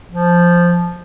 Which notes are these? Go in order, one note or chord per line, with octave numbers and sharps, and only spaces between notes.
F3